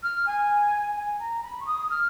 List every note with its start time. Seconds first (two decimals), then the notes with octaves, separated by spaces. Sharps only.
0.03 F6
0.26 G#5
0.96 G#5
1.19 A#5
1.43 B5
1.60 C#6
1.66 D#6
1.90 F6